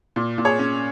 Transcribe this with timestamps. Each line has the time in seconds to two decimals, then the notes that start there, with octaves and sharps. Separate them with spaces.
0.16 A#2
0.38 A#2
0.45 G#4 C#5
0.59 C#4